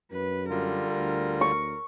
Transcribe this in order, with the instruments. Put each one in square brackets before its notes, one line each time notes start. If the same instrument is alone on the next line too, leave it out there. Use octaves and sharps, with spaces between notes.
[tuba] F#2 [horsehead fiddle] B4
[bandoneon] D3 G3 F4 [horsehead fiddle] A#4
[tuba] D2
[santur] C#6